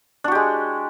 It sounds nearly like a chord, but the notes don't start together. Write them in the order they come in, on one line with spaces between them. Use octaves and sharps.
D4 F#4 G4 G#3